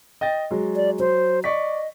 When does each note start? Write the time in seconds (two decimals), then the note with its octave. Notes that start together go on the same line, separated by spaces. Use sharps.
0.21 D#5 G5 A6
0.51 F#3 G#3
0.76 D5
1.00 F#3 C5
1.44 D5 D#5 C#6 B6